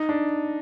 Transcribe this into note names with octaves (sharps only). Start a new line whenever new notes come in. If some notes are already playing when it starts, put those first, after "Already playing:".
Already playing: D#4
D4